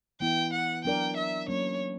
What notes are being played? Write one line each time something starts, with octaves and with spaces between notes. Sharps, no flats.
E3 B3 E4 G5
F#5
F#3 B3 D4 A#4 D5 G5
E5
F#3 A#3 C#4 C#5